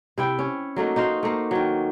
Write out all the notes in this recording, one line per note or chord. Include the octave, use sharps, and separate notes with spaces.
C3 E4 G5
C#4
F#3 A3 A#3 D#4
D#4 F#4 C5 F5
A3 A#3
D#3 F#3